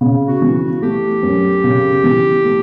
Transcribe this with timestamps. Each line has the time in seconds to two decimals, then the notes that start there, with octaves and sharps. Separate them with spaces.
0.01 C#3
0.28 F#4
0.42 E3
0.55 F#4
0.82 A3 G4
1.23 F#2
1.64 C#3
2.04 E3
2.45 A3